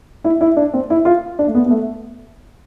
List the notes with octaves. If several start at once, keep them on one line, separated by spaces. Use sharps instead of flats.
E4
E4
D4
C4
E4
F4
D4
A3
B3
B3
A3